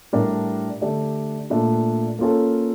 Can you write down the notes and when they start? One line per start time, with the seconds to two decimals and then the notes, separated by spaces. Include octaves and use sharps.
0.13 A2 G3 D4 G4 A#4
0.81 D3 A3 D4 G4 D5
1.50 A#2 A3 D4 F4
2.19 A#3 C#4 F4 A4